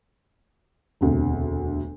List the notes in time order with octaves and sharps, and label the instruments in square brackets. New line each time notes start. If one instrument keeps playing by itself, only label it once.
[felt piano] E1 D2 C3